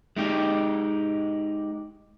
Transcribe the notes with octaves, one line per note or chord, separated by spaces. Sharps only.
G#3 D#4 G4